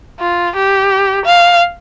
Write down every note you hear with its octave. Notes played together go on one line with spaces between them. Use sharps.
F4
G4
F5